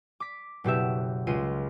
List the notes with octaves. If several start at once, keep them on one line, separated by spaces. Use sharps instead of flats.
D6 B6
F#1 B2 G4 E5
C#2 F4 D#7